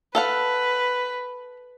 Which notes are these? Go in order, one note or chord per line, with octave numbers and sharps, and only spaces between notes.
A4 B4 F5 F#5